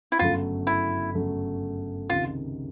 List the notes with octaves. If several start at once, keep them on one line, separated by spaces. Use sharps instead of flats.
E4
G1 F#2 C#3 F#3 A3 F4
E4
G1 F#2 C#3 F#3 A3
C#2 C3 D#3 F4